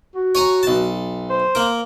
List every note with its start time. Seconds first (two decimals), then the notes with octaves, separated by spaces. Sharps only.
0.15 F#4
0.35 C#5 G#5 A#5
0.63 B1 A5
1.30 C5
1.55 A#3 A#4